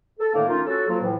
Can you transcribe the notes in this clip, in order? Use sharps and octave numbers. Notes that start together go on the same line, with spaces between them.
A4
A2 D3 D#3 A3 A#3
A3 A#3 C#4 D#4 F4
C#4 F#4 A4
F3 F#3 A#3 F4
F2 A2 E3